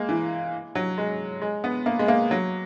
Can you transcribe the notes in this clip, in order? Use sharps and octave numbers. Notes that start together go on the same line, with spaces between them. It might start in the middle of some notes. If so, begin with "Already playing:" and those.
Already playing: G#3 A#3
E3
F#3
G#3
G#3
B3
A#3
G#3
A#3
F#3